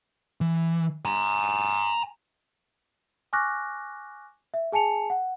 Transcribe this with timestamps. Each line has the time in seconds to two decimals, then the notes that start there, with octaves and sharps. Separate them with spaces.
0.41 E3
1.05 G#5 A#5
3.33 G#5 C#6 D6 F6 F#6 A#6
4.54 E5
4.72 G#4 G#5 A5 C#7 F7
5.10 F#5